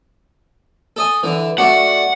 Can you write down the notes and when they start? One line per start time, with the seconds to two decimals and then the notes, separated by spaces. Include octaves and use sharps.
0.96 A4 D#5 G#5
1.23 D3 E3
1.58 A3 D4 F#4 F#5